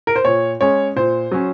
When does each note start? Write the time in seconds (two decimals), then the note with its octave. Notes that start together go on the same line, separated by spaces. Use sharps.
0.07 A#4
0.16 C5
0.25 A#2 C#5
0.61 G#3 C#4 C#5
0.96 A#2 C5
1.31 F#3 C#4